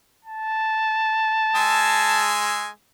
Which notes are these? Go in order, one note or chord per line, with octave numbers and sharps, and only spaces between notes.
A5
G#3 G#5 E6